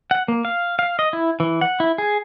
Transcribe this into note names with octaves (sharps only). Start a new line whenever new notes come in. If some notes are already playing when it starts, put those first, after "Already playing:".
F#5
A#3
F5
F5
D#5
E4
E3
F#5
E4
G#4